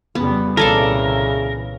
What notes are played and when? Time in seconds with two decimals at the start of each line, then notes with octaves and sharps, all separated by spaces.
0.15 F2 C#3 G3 B3
0.57 C2 A#2 C#3 E3 A4 A#4 D5 F5